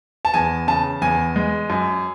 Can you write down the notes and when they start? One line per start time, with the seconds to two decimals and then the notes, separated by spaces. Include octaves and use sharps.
0.25 A5
0.34 E2 G#5
0.68 C#3 A5
1.01 E2 G#5
1.36 G#3
1.70 F#2